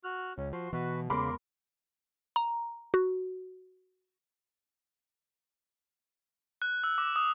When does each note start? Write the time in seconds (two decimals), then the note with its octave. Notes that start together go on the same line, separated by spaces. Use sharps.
0.04 F#4 F6 F#6
0.37 C#2 C#4
0.53 F3 F#4 C6
0.73 B2 E3 F#4 B4
1.10 E2 C#3 G#3 B3 A#4 B5 C6 D6
2.36 A#5
2.94 F#4
6.62 F#6
6.84 E6
6.98 D6
7.16 D#6